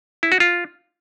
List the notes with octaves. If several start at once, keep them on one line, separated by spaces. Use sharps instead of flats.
E4
F#4
F4